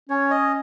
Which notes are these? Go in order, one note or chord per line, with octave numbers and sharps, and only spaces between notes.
C#4 C#5
D#5